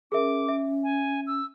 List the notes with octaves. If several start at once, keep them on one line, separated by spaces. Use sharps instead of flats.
C#4 G#4 A#4 E5 D6
E5
G#5
E6